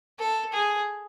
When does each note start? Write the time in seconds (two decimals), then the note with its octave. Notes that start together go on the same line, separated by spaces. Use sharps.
0.20 A4
0.53 G#4